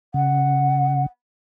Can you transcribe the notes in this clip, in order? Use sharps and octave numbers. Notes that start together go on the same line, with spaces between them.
C#3 F#5